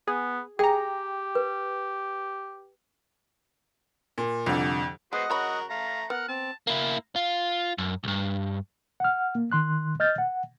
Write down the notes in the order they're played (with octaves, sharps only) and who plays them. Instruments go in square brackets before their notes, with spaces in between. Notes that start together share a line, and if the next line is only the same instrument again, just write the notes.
[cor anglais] B3 [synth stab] G#4
[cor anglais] G4 [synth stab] G#4 A#5 [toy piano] G5
[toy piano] B4
[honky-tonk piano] A#2
[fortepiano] C2 D3 [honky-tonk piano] F2
[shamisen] G#3 [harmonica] B3 F#4 C5 [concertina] D#5 F#5
[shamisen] C#3 C#5 B5 [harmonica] F#4 A#4
[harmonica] A3 A#5 [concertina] F5
[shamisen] B3 [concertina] A#4 F6 [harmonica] F#5
[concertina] C4 [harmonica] A5
[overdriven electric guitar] A#3 E4
F4
F#2
B1 G2
[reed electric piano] F#5 F6
A#3
D#3 C6 F#6
D#5 F6 G6 A6
F#5